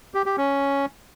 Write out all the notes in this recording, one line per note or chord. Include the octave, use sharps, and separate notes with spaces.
G4
G4
C#4